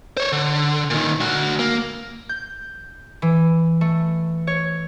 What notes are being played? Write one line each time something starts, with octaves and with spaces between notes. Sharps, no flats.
C5 C#5
D3
A#2 D#3
D2 F#4
A#3
G6
E3
A3
C#5